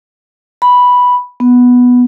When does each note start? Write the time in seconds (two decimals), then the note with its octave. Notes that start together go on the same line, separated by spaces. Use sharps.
0.62 B5
1.40 B3